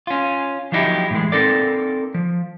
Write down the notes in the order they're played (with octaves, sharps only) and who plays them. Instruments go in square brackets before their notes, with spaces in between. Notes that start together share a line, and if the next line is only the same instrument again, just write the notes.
[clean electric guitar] C#4 F4
F3 F#3 B3 D#4 E4 G4
A2 E3 G#3
C4 D#4 A4 A#4 D5
F3